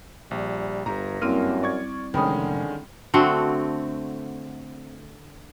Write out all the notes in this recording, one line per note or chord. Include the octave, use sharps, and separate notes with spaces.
A#1 G3
G1 G2 A#5
F#2 G3 A#3 C4 E4 F6 D#7
D5 C#6 G#6
F1 D3 D#3 G#3 C#4 G5 B5 D#6
D3 A3 C4 F#4